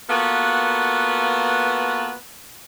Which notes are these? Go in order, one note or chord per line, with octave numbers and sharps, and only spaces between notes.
A#3 B3 F4 F#4 A4 B4